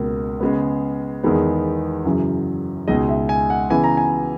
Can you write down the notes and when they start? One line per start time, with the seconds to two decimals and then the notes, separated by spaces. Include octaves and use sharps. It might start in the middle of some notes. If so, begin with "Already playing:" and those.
Already playing: C#2 B2 A#3
0.40 C#3 G#3 B3
1.23 E2 D#3 G#3 B3
2.05 F#2 C#3 E3
2.88 C#2 B2 G#3 D#4 D#5
3.09 E5
3.29 G#5
3.50 F#5
3.70 C#3 E3 B3 G#5
3.84 A#5
3.97 G#5